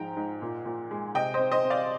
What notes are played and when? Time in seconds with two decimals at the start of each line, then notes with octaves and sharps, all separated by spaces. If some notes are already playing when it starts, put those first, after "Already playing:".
Already playing: G#2 F3 G#3 G5 A#5
0.17 G#2
0.42 A#2
0.66 A#2
0.91 G#3
1.15 C3 D#5 G5
1.34 C5 D#5
1.39 C4
1.52 C5 D#5
1.64 C4
1.70 D5 F5